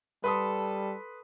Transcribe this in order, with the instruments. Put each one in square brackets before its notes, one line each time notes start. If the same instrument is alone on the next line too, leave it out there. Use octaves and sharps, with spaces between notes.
[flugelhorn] G3 [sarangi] A4 [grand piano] B4 C6 D#6